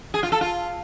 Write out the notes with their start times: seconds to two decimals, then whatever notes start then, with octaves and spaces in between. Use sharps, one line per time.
0.14 G#4
0.23 F4
0.32 A4
0.41 F4